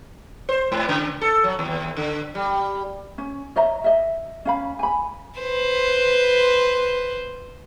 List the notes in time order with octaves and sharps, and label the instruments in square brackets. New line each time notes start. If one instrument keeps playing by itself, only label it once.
[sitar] C5
G#2
C#3
A4
F#3
D#2
D3
G3
[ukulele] C#4
C#5 D#5 E5 A#5
D#5 E5
C#4 F5 B5
G#5 B5
[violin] B4 C5